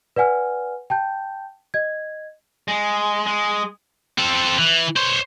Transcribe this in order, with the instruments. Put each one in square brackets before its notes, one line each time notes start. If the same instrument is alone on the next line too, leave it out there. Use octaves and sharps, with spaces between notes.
[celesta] B4 D5 F#5 G#5 F6
G5 A5 G6
D#5 G#6
[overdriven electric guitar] G#3
G#3
[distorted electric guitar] C4 A4
E3
C5 C#5